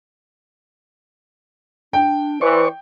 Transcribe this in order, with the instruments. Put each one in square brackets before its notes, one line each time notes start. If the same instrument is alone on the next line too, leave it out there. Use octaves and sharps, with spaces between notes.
[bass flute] D4 [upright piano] G5
[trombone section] E3 [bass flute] B4 [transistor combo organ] C5 D5 C#6